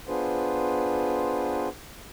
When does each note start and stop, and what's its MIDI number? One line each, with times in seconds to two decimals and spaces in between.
0.08 1.69 59
0.08 1.69 62
0.08 1.69 65
0.08 1.69 68
0.08 1.69 71
0.08 1.69 72